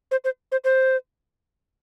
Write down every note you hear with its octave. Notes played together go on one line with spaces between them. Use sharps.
C5
C5
C5
C5